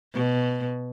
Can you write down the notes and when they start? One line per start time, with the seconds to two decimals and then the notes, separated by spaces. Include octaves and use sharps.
0.14 B2